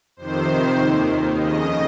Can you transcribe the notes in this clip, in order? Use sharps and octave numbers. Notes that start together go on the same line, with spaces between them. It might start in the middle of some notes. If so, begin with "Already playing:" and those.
F2 C3 D#3 C5
D#2 D#3
F2 C#3 D#5